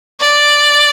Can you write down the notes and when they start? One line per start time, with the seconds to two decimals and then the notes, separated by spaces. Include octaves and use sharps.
0.20 D5